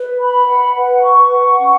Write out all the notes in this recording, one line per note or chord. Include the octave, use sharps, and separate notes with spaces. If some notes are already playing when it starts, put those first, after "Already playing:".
Already playing: B4
B5
F#5
B4
C#6
F#5
C#4